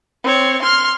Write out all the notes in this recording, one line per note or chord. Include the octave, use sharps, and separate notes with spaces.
C4 C#5
C6 F6